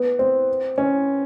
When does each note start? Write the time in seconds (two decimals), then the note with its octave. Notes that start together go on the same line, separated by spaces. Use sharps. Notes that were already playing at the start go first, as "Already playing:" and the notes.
Already playing: B3
0.19 C4
0.78 C#4